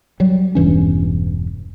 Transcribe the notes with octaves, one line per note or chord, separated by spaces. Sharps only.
F#3 G3
E1 G2 E3 C#4